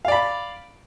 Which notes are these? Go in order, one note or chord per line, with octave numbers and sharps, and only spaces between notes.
D5 F5 B5